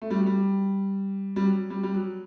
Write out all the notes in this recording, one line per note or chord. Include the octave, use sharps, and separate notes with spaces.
A3
G3
F#3
G3
G3
F#3
G3
G3
F#3